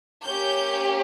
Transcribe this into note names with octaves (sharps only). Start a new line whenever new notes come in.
A#3 C#4 G4 G6